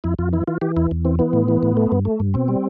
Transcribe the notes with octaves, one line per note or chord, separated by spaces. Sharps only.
F2 E4
F2 F4
E3 E4
E3 F4
E3 G4
E2 E4
E2
E3 C4
E3 B3
A2
E3
A2
A3
G2
A3
G2
B2 C4
G3